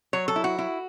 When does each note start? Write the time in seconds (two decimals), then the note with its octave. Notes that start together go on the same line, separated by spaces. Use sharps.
0.13 F#3 C#5
0.28 A4
0.36 E4
0.44 F#4
0.58 E4